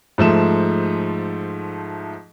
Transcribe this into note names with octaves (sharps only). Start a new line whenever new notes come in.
G#2 F3 A3 E7